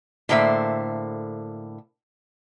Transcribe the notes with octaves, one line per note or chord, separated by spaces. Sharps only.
A2 D3 A#3 C5 E5